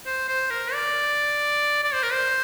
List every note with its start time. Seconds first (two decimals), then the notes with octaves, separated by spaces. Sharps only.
0.06 C5
0.28 C5
0.50 A#4
0.73 D5
1.83 D5
1.93 C5
2.03 A#4
2.12 C5